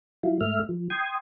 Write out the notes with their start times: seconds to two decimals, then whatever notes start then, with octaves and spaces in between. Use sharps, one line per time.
0.23 F#3 E4 F4
0.41 G#2 A3 E5 F6
0.69 F3
0.90 G5 C6 D#6 G#6